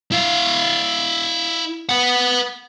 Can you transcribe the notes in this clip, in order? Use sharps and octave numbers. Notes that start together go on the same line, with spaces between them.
E4 F5
B4 F#5